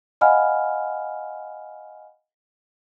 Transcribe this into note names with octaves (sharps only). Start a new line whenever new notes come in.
D#5 F5 F#5 G#5 B5 F6